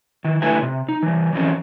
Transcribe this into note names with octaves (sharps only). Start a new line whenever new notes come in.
D#3 E3
D3 A3 E4 B4 E5 G#5
C3
D#4
E3 G3
E3 F#3 C4 C#4